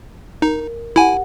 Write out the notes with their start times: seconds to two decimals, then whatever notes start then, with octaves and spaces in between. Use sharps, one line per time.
0.42 D#4 A#4
0.96 E4 G4 F#5 G#5